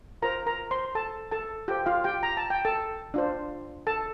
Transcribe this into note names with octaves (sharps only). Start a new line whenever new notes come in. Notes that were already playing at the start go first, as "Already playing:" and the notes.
F4 A#4 C5 A#5
A#4 A#5
C5 C6
A4 A5
A4 A5
F4 G4 A4 C5 G5
F4 F5
G4 G5
A#5
A5
G5
A4 A5
D4 F4 C5
A4 A5